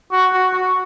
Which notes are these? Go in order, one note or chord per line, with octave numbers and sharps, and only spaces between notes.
F#4
F#4
F#4